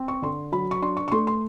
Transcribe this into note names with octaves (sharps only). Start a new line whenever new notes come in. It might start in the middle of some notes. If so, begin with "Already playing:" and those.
Already playing: C4
C#6
D3 C6
F#3 B5
C#6
D4 C6
C#6
C#6
A3 C6
C6